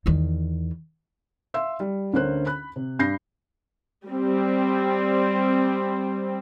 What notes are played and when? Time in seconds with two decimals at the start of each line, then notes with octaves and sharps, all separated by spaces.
0.06 E2 D#3
1.54 E5 F5 C6 E6
1.80 G3
2.13 D2 D3 C#4 A#4 C5 F#6
2.46 B5 F#6
2.76 C3
2.99 G2 B5 G6 A#6 C7
4.07 G3 C4